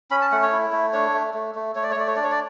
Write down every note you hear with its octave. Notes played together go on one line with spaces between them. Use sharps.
C#4 B5
A5
A3 F#5
C#5
E4
A3
D4 C#5
A3
A3
A3
A3 C#5
D5
C#5
A3 D5
C#5
D4 D5
C#5
D5